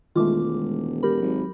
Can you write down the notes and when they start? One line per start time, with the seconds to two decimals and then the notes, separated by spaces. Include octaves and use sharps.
0.16 E1 D#3 G#3 A3 F4 D6
1.03 G4 A#4 B5
1.21 G#1 F#3